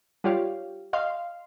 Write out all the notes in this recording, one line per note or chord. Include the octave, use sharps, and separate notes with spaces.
G3 F4 G4 C#5 F5
D#5 F5 C6